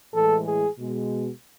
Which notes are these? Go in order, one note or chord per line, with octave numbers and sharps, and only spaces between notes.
A2 E3 G#3 A4
G#4
B2 G#3